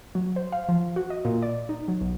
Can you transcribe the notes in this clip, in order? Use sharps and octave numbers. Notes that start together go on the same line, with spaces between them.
F#3
C5
F5
F3
F#4
D#5
A#2
D5
D#4
F#3
B1